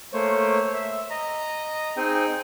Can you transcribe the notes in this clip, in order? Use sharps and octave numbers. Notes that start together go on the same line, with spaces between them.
A3 A#3 C5 C#5
E5
D#5 A#5
C4 D#4 G#4 G5 G#5